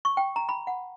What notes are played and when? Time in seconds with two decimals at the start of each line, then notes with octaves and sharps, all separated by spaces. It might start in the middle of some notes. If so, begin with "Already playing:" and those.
0.05 C#6
0.17 G5
0.36 A#5
0.49 B5
0.67 F#5